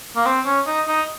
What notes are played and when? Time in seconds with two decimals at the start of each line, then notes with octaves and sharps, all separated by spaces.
0.16 A#3
0.26 C4
0.46 C#4
0.67 D#4
0.88 D#4